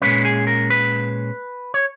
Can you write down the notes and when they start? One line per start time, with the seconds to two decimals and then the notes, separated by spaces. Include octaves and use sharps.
0.02 A#2 G#3 C#4 B4
0.25 G#4
0.47 A#4
0.70 B4
1.74 C#5